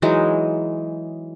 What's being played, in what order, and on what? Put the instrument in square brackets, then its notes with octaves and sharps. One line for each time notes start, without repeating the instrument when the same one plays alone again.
[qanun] E3 F#3 G#3 D#4